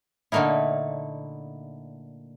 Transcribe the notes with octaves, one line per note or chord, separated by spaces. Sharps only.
A#2 D3 A3 A#3 D#4 E4